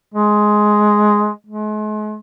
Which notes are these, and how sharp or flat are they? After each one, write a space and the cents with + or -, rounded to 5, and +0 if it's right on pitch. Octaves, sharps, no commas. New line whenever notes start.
G#3 +10
G#3 +40